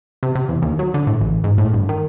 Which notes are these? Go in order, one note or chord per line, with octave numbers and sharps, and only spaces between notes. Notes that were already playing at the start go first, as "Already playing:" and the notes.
C3
C3
E2
D#2
F#3
D3
A2
A1
G#2
A2
G1
D#3